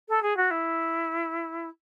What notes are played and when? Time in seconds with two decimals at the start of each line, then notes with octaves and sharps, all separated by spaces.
0.09 A4
0.22 G#4
0.37 F#4
0.51 E4